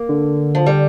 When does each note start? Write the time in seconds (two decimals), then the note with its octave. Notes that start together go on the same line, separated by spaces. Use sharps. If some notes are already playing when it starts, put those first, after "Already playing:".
Already playing: A#3
0.09 D3
0.55 F3
0.66 G3